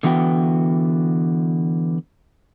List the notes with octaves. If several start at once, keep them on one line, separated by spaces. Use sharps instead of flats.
D3 E3 B3 F#4 G5